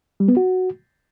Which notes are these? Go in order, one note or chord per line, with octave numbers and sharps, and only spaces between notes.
G3
B3
F#4